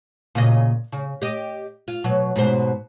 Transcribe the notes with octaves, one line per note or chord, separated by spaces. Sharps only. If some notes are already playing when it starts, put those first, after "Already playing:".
A#2 C#3 D#5
C#3
G4 D#5
F4
B2 F#3
G#2 B2 C5